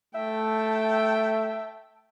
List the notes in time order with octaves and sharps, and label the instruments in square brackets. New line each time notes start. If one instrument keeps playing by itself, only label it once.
[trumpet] A3 [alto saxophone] E5 [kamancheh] G5 A5